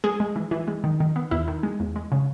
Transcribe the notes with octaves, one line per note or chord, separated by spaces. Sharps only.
G#3 G#4
G#3
E3
E3
G#3
D#3
D#3
B3
E2 E4
D#3
G#3
E2
G#3
C#3